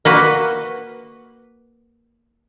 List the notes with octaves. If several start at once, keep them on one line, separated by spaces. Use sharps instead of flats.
A#3 F#4 B4